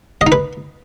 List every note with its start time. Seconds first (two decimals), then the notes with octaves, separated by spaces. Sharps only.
0.21 D#5
0.27 D#4
0.32 B4